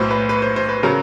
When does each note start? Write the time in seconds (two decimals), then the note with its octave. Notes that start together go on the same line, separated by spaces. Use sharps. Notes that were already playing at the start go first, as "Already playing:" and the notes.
Already playing: B1 A2 F#3 B4 C5
0.11 B4
0.29 B4
0.42 C5
0.56 C5
0.69 B4
0.83 C#3 F#3 A#4